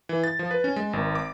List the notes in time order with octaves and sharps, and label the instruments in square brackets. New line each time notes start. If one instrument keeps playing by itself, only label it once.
[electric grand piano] E3
A6
F3
B4
C#4
G#3
G#1
D6